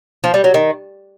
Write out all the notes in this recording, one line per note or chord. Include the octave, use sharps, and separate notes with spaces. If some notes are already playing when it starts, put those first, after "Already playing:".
F3
G3
F#3
D#3